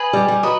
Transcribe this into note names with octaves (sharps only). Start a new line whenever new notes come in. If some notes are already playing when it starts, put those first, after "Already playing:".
Already playing: G#4 B4 D#5
G3
G3
F#3 B4 D#5